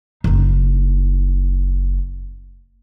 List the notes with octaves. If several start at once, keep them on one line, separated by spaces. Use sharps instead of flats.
F#1 D#4